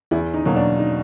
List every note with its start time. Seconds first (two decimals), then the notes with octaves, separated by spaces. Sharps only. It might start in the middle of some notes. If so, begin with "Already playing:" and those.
0.11 E2 E4
0.34 D#4
0.45 B2 F#3 A#3
0.56 D4
0.79 D#4